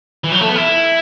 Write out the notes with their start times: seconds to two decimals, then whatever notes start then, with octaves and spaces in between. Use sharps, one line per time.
0.24 E3
0.32 F#3
0.41 A3
0.48 B3
0.56 E4